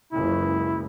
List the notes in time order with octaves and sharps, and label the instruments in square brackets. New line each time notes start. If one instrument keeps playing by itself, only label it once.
[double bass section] F#1 C#2 [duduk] E4